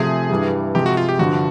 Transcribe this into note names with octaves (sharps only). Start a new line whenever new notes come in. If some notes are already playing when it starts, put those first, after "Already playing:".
Already playing: C3 F3 A3 G#4
G2 E3 G3
C3 F3 G#3 G4
F#4
F4
G4
G2 D3 F3 F#4